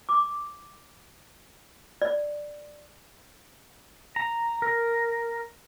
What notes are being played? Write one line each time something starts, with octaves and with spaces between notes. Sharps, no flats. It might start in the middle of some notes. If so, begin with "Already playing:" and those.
D6
D5
A#5
A#4